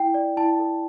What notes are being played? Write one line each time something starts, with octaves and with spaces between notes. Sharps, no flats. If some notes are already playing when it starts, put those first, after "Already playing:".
Already playing: E4 G5
D5
E4 A5
A4